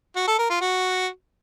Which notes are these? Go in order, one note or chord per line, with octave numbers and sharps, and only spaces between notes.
F#4
A4
A#4
F4
F#4